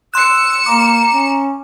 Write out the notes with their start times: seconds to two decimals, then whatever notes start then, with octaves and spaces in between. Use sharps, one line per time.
0.14 C6 E6 F#6 C#7 E7
0.66 A#3 A#5 D6
1.13 C#4